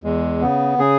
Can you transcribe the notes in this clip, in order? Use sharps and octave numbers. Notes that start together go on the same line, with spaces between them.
E2 G#3
C#3 B3
C#3 G#4